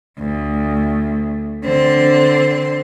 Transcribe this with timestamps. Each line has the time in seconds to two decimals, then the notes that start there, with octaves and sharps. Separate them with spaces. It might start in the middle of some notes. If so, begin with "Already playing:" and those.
0.18 D2
1.64 D3 C4 C6